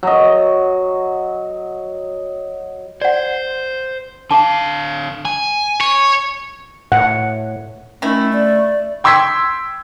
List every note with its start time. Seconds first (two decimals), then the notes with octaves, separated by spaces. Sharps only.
0.03 F#3 D#5
3.02 C5 D5 F#5
4.31 D3 F5 A5 D6
5.25 G#5
5.81 C#5
6.92 A2 F#5
8.02 D#3 A3 C#4 E4
8.33 D5
9.04 G5 C6 E6 G#6 B6